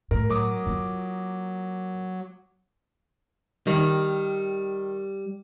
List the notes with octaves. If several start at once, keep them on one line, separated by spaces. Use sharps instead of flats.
A2 A#4
F#3 A#4 D6 D#6
A#3 F4
D#3 G3